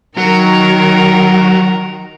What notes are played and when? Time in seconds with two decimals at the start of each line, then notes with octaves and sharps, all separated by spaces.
0.17 D#3 F#3 A#4